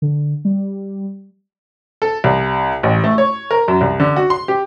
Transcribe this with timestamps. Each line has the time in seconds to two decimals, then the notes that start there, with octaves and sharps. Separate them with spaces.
0.02 D3
0.45 G3
2.02 A4
2.24 C2
2.83 A1
3.04 A3
3.18 C#5
3.51 A#4
3.68 F#2
3.81 C2
4.00 D3
4.16 F#4
4.30 C6
4.48 G4